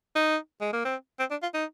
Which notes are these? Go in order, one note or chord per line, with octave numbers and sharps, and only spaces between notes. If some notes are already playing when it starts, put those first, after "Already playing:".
D#4
G#3
A#3
C4
C4
D4
F4
D#4